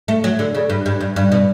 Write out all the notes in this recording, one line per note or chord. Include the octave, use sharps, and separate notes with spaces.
A3
F#3
D3
C#3
G2
G2
G2
G2
B2